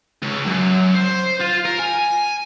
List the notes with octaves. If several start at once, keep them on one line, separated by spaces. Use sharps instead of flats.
C#2
F#2
C5
F4
A#4
G#5